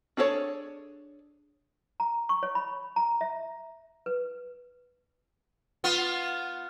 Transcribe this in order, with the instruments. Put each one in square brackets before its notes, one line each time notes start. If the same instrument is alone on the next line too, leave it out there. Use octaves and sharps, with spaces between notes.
[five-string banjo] D4 G#4 A4 B4 C#5
[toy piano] A#5
C#6
C#5
B5
A#5
E5
B4
[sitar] B3 F4